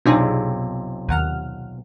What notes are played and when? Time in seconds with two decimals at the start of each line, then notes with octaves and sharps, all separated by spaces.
0.06 B1 F2 C3 D4 D#4 G#4
1.08 D#2 F#5 F6